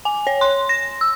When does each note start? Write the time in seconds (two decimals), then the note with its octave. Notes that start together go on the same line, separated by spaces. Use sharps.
0.05 G#5
0.27 C#5
0.41 C6
0.69 A#6
1.01 E6